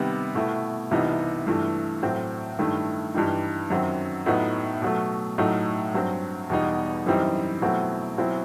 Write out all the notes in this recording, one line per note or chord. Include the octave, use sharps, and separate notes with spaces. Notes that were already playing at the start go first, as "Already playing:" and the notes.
Already playing: C3 D#3 G3 B3
B2 A3 E4
C2 C3 E3 B3 D#4
G2 E3 A3
A2 F#3 C4
G2 D#3 A3 E4
G2 E3 G3 D#4
F#2 D#3 F#3 C4
A2 F#3 B3 D#4
B2 F#3 A3
A2 F#3 A3 D#4
G2 F#3 C4
E2 B2 G3 D#4
F#2 E3 G3 C4 D#4
B2 F#3 A3 C4 E4
B2 F#3 C4 E4